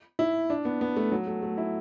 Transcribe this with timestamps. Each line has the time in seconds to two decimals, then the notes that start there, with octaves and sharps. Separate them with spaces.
0.19 E4
0.50 D4
0.65 B3
0.81 B3
0.97 A3
1.12 F#3
1.27 A3
1.43 A3
1.58 E4